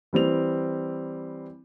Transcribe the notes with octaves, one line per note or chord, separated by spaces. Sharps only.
E3 G3 C4 F7